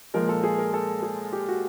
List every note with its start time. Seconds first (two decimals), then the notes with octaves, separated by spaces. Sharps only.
0.14 A#2 F3 G#3 A#4
0.29 A4
0.44 G#4
0.58 A#4
0.74 A4
1.03 G#4
1.33 G4
1.48 F#4